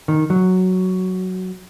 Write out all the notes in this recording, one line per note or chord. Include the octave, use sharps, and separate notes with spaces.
D#3
F#3